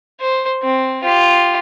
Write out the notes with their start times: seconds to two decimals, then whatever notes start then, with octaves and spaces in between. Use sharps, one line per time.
0.20 C5
0.63 C4
1.04 F4 G4